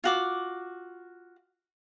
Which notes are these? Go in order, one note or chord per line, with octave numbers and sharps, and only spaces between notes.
F4 F#4 D6